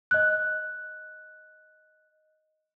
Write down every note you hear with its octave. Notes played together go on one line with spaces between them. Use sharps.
D#5 F#6